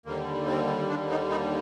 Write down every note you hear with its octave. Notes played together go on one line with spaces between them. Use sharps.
D#2 D3 G3 A#3
C4
D4
D#4
D#4